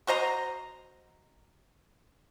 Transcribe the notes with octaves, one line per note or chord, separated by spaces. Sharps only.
F#4 C5 D#5 A#5